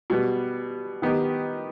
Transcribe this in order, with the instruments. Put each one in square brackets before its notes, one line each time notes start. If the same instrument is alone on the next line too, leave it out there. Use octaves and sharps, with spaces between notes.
[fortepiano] B2 G3 B3
D#3 B3 D#4 G4